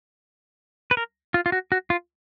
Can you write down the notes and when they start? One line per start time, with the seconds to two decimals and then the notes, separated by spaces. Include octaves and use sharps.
0.91 B4
0.97 A#4
1.34 F4
1.46 F4
1.52 F#4
1.72 F#4
1.90 F4